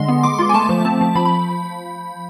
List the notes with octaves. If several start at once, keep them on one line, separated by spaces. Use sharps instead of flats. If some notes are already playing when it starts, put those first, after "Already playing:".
Already playing: D3 G#3 C6
B3
G#3 D6
F4 C6
G#5
A3 A5
F3
C4 A5
F3
F3 B5
B5